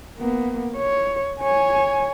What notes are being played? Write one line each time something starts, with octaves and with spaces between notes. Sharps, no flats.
A#3 B3
C#5
C#5 G#5